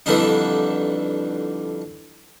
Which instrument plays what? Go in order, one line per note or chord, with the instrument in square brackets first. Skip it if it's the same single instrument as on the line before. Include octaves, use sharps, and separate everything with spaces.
[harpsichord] F2 D3 E3 G3 D4 D#4